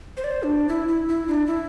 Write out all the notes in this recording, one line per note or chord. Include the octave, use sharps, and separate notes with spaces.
C5
D5
C5
D4
E4
E4
E4
D4
E4